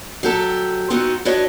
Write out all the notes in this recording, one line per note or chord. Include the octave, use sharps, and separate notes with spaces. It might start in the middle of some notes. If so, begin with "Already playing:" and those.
F#3 G4 A4
B3 C4 D#4 F#4
D4 E4 F#4 B4 C#5 D#5